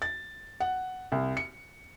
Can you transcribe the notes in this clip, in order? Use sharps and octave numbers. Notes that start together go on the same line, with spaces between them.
A6
F#5
C2
C#7